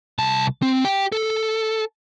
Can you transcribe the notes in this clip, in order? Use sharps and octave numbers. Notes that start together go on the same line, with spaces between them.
C2 A5
C4
G4 G5
A4